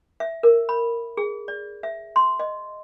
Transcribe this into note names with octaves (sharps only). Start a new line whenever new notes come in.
E5
A#4
B5
G#4
D5
E5
C6
D#5